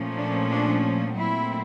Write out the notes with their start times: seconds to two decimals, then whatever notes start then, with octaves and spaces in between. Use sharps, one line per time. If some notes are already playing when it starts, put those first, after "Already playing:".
Already playing: A#2 F3 A3 C#4
0.17 D4
0.50 D4
1.17 A#2 F#3 A3 C4 E4